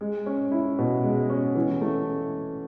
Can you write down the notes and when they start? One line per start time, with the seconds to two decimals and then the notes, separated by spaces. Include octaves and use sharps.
0.01 G#3
0.26 C#4
0.51 E4
0.79 B2
1.04 G#3
1.30 C#4
1.55 E3
1.81 A3